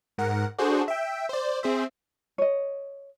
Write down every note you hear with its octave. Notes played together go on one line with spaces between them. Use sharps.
G#2 A#4 F#5
D4 F#4 G#4 A4 C5
E5 G5
C5 D5
C4 G#4 C5 E5
C#5 D#5